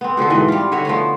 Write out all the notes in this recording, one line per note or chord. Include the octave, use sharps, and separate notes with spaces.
B3 C4
B2 D3 F3 A4
G#2 E3 C4 D#5
G3 F4
D3 F#4 C#5 E5
F3 A3 B3